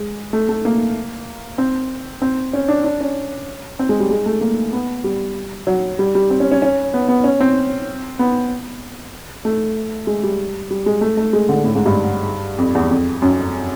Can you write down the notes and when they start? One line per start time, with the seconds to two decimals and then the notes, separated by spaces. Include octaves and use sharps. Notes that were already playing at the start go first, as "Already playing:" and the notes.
Already playing: G#3
0.33 A3
0.49 A3
0.65 A#3
1.58 C4
2.22 C4
2.53 C#4
2.68 D4
2.84 D4
3.01 C#4
3.79 C4
3.89 G#3
4.00 G3
4.11 G#3
4.26 A3
4.41 A#3
4.73 B3
5.04 G3
5.67 F#3
5.99 G3
6.15 G3
6.30 C4
6.40 C#4
6.52 C#4
6.62 C#4
6.94 B3
7.08 B3
7.24 C#4
7.40 C4
8.19 B3
9.45 A3
10.07 G#3
10.23 G3
10.71 G3
10.86 G#3
11.01 A3
11.17 A3
11.33 G#3
11.49 D3
11.64 A2
11.75 G#2
11.86 G2
12.58 F2
12.75 E2
12.91 F2
13.22 F#2